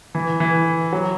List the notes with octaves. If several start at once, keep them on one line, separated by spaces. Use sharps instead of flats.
E3
E3
F#3